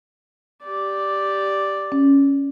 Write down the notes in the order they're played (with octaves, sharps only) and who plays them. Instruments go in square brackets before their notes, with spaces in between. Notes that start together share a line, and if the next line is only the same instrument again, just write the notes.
[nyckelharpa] G4 D5
[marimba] C#4